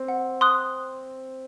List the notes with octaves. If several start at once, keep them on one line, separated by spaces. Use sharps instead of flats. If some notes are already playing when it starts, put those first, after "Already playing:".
Already playing: C4
F#5
C6 D#6 F#6